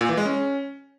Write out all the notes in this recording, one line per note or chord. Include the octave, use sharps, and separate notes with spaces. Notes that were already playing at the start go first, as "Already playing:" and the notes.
A#2
E3
G#3
C#4